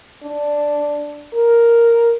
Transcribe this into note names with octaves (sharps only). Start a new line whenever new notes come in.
D4
A#4